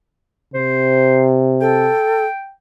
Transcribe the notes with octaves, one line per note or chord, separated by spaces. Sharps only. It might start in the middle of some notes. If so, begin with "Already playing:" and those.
C3 C5
A4 G5